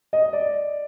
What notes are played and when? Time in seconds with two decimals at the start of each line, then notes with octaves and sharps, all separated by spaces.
0.13 D#5
0.33 D5